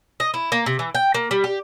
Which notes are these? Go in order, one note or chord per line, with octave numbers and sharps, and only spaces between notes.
D#5
E4
A#3
C3
E3
G5
A#3
G3
G4